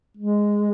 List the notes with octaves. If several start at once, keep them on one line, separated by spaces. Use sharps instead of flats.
G#3